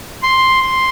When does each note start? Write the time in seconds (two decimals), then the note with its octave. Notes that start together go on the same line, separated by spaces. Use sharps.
0.23 C6
0.61 C6